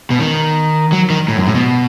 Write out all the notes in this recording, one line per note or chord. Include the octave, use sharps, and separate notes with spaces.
B2
D#3
F#3
D#3
A2
F#2
A2
B2